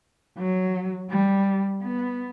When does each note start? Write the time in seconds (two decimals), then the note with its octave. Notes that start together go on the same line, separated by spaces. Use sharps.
0.38 F#3
1.10 G3
1.83 B3